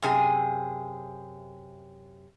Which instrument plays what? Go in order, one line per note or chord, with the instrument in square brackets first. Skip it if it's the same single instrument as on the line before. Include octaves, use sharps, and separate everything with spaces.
[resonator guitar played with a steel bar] F#2 C3 G#4 G#5